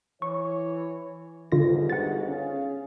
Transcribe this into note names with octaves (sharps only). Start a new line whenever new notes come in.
E3 C#5 C#6
G1 D2 G#2 D3 F4 A#6
F#5 A6
C#4 G#4 F5